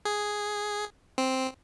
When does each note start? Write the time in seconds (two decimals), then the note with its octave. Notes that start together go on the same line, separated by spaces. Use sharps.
0.05 G#4
1.18 C4